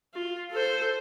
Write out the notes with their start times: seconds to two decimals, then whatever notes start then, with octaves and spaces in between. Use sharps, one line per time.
0.14 F4
0.51 A4 C5